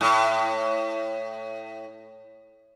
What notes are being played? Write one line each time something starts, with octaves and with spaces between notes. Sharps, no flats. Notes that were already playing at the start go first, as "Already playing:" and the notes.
A2